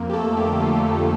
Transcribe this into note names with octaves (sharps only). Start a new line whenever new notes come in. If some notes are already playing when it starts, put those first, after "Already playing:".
Already playing: F2 A#3
G4
A3 A4
D3 G4
G4
F2 F4
F2